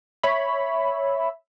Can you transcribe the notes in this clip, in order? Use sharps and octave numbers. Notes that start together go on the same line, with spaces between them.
C#5 E5 B5